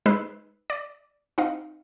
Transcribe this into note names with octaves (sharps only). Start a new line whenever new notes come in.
G#3 D#4 B4 C5 E6 C7
D5
C4 D#4 D#5 F5